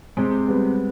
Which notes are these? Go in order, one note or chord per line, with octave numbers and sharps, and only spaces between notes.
C3 G#3 C4
G3 B3